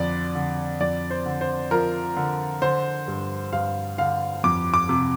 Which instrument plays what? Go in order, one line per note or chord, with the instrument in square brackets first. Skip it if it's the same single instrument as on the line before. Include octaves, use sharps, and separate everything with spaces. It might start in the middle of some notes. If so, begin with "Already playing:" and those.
Already playing: [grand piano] F2 D3 D5
D3
F2 D5
C5
D3
C5
F3 A#4
D3
D3 C5
G2
G2 F5
D3 F5
F2 D6
D6
C3